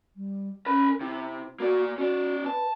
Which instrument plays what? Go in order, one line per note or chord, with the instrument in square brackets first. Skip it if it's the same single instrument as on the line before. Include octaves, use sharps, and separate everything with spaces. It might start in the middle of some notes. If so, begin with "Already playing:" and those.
[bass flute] G3
[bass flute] C#4 [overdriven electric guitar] A#4 B5
[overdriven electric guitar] C3 [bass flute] E4
[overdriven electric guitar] A#3 D5 [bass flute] F#4
[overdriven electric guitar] C#4 D5 [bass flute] F#4
[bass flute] B4 [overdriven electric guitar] A5